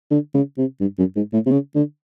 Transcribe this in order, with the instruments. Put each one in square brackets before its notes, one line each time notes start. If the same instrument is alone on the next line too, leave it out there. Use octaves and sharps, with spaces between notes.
[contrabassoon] D3
C#3
C3
G2
F#2
G#2
A2
C3
C#3
D3